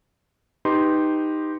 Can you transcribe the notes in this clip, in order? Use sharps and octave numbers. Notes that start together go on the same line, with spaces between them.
D#4 G4 B4 C6